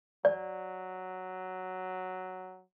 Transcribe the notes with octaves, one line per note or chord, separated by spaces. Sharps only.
F#3 D5